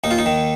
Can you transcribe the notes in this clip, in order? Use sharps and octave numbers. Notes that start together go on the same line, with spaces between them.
D#2 D#4
F4
D#4
D#3